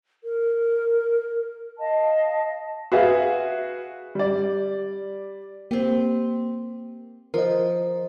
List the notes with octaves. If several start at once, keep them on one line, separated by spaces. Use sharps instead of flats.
A#4
D#5 F5 A5
F#4 G#4 B4 E5 F5
G3 D5
A#3 C4 G4
F3 A#4 D#5